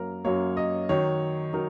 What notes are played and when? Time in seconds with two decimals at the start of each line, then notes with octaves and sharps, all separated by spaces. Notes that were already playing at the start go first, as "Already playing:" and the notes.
Already playing: F#2 F#3 A#3 A#4
0.24 F#2 F#3 A#3 C#5
0.57 D#5
0.89 D#3 F#3 D#4 C#5
1.53 D#3 F#3 D#4 A#4